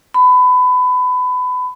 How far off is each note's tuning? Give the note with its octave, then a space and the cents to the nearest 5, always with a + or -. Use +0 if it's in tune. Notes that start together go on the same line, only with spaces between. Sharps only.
B5 +25